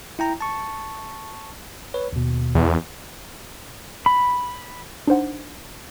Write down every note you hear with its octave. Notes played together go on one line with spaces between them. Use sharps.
E4 G5 A#5
A5 C#6
B4 C#5
D#2 B2
E2
B5
D4 D#4 C5 F#5